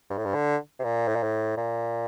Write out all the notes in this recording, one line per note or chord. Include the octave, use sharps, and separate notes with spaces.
G2
A2
G2
D3
C3
A#2
A2
A#2
A2
A#2